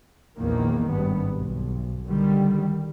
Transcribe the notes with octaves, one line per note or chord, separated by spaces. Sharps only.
A#1 E2 D#3 A#3
G#1 G2 B3
B1
D3 D#3 G3